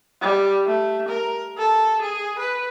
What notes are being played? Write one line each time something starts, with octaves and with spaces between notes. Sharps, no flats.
G3
A3
A#4
A4
G#4
B4